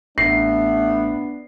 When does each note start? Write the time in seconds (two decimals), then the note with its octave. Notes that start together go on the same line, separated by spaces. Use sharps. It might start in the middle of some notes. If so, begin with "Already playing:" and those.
0.18 A1 A3 B3 D4 C7